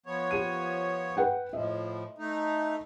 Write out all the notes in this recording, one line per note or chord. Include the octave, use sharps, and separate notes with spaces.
F3 B3 C#5
G4 D#7
B4 F#5 G5
A2 F3 D#5 E5
A3 D#4